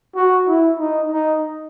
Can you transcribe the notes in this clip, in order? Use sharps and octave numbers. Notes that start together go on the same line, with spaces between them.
F#4
E4
D#4
D#4